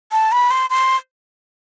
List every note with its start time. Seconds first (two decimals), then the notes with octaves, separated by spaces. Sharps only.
0.12 A5
0.32 B5
0.51 C6
0.70 C6